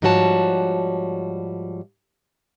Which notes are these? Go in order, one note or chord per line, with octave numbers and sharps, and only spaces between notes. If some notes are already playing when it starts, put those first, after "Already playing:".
G#2 F3 G3 F#4 C#5 A5